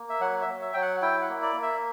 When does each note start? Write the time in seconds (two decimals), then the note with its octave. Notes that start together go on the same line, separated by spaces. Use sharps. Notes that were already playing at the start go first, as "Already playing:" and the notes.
Already playing: A#3
0.10 E5
0.21 F#3 F#5
0.42 E5
0.47 F#3
0.61 E5
0.73 F#3 G5
0.82 F#5
1.02 E4 G5
1.22 F#5
1.29 A#3
1.42 D5
1.56 A#3
1.62 E5